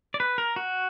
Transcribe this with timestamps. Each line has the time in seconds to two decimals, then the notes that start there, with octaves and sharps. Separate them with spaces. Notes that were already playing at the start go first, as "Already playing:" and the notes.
0.14 D5
0.20 B4
0.38 A#4
0.56 F#4